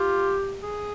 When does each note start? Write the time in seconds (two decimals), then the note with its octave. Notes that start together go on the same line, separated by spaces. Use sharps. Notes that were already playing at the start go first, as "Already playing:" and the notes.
Already playing: F4 G4
0.63 G#4